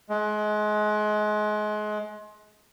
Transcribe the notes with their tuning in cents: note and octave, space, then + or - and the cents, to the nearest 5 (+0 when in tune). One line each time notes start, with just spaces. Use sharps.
G#3 +30